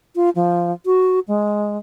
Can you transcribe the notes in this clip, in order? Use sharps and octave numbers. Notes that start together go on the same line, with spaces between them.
F4
F3
F#4
G#3